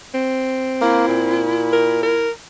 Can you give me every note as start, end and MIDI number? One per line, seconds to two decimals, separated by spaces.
0.14 1.49 60
0.81 1.07 58
0.81 2.25 64
1.08 2.16 46
1.73 2.00 70
2.03 2.31 70